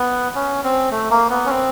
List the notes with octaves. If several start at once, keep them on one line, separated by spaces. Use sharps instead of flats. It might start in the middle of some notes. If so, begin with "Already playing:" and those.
Already playing: B3
C#4
C4
A3
A#3
B3
C#4
C4